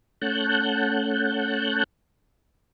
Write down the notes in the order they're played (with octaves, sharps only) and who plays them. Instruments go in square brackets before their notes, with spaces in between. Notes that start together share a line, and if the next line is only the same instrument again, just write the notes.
[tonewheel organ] A3 C#4 F#5 A5 F#6 G6